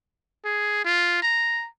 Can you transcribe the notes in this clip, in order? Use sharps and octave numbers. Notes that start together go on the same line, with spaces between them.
G#4
F4
A#5